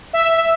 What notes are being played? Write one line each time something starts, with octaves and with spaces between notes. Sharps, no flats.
E5